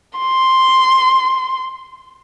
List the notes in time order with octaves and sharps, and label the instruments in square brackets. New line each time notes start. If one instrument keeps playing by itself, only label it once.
[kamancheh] C6